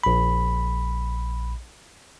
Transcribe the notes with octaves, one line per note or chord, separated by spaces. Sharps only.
A#1 B5